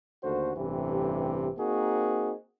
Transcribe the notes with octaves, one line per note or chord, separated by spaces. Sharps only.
D#2 D3 A3 F#4 C5
A1 G2 C3 E3 G4
A#3 C4 D#4 F#4 G#4